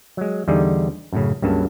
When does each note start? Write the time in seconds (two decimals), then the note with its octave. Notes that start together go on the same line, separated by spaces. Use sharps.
0.17 F#3 G#3
0.48 E2 D3 G3 D#4 G#4
1.13 F#2 A2 C#3
1.42 C#2 G2 C#3 F#3 A#3 A5